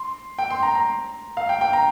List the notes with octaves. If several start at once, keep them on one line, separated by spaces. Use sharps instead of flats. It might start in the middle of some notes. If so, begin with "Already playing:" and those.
Already playing: C6
G5
C6
A#5
A#5
F5
G5
G5
A#5